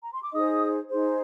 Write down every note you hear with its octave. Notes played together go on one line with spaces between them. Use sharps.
A#5
C6
D6
D#4 G#4 C5 D#5 D#6
D#4 G#4 C5